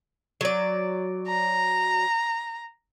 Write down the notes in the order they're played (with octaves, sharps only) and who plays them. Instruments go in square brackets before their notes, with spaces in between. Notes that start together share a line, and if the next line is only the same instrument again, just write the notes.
[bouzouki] F#3 D5
[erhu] A#5